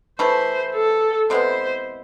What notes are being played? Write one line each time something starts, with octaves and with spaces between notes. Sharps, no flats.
E3 A3 E4 C5
A4
C3 G#3 B3 E4 C5